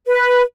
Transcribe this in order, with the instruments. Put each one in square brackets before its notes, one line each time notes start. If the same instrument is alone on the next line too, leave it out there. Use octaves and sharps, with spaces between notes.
[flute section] B4